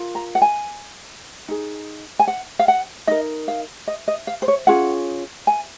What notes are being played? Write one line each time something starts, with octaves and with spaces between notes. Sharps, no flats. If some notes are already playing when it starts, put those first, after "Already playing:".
Already playing: F4 A#4
A#5
F#5
G#5
D#4 G#4
G#5
F#5
F5
F#5
D#4 A#4 D#5
F5
D#5
D#5
F5
C5
C#5
C#4 F4 G#4 F#5
G#5